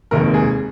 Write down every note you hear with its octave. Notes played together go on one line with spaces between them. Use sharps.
F1 D#2 D#3 G#3 A#4
G#4